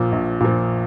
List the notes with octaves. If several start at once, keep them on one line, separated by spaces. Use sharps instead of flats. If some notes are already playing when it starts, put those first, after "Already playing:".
Already playing: A#1 A#2 F3
A#1
A#2 F3